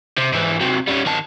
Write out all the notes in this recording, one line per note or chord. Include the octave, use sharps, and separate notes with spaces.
C3
G#2 E3
C3 F#3
G3 C#4
D#3 A5